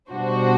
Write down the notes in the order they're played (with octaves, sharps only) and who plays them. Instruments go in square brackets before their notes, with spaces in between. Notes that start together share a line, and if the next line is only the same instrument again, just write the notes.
[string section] B2 G3 D4 F#4 C5